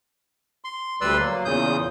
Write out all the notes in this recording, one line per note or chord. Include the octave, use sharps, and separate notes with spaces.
C6
D2 G3 B4 D5 C6 E6
F#3 A#3
E2 A#2 C#3 D#6 G6